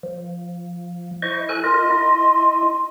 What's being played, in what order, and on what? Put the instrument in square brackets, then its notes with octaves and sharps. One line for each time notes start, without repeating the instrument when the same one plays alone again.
[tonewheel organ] F3
[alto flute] E4 [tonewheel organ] C5 D#5 C#6
[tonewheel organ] A4 G#5 F#6
[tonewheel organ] F4 A#4 D#5 [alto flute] C6
[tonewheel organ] E4 D#5